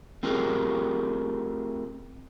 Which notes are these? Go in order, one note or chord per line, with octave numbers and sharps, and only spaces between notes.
A3 C4 F4 G4 G#4 A#4